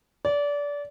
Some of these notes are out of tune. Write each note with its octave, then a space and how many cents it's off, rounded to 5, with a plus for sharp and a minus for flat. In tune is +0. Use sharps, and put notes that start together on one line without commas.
D5 -25